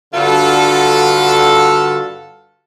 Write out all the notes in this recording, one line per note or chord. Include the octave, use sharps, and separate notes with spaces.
G2 D3 F4 F#4 A4